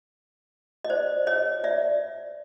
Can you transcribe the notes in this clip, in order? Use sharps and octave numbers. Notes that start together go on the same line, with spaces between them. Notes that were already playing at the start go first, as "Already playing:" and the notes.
D#5
C5 D5
C#5 D#5
D5 E5